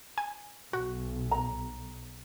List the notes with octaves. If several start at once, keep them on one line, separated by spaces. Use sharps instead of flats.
G#5
B1 F#4
A#5